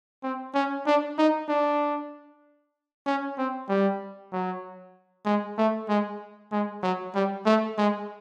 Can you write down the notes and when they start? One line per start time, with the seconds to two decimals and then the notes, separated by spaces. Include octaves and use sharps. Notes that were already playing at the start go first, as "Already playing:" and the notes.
0.23 C4
0.55 C#4
0.87 D4
1.18 D#4
1.49 D4
3.06 C#4
3.38 C4
3.69 G3
4.33 F#3
5.26 G#3
5.58 A3
5.89 G#3
6.52 G#3
6.83 F#3
7.15 G3
7.46 A3
7.78 G#3